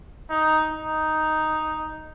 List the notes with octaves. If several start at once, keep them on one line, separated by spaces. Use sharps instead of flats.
D#4
D#4